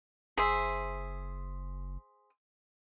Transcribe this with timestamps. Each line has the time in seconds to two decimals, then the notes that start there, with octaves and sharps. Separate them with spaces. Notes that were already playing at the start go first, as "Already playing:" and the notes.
0.37 F#1 G#4 C5 E5